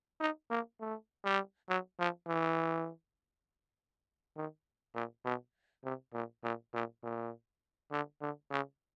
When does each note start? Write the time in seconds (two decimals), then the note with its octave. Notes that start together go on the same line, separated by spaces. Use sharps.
0.20 D#4
0.50 A#3
0.80 A3
1.25 G3
1.69 F#3
1.99 F3
2.28 E3
4.37 D#3
4.95 A#2
5.25 B2
5.84 C3
6.13 A#2
6.44 A#2
6.74 A#2
7.04 A#2
7.91 D3
8.21 D3
8.51 C#3